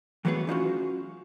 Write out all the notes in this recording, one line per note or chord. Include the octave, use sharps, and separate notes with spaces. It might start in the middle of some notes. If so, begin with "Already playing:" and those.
E3 F#3 A3 B3 F#4 G#4
C#4 D#4 F4 F#4